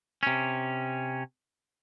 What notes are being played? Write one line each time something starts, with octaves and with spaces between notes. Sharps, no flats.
C3 C#4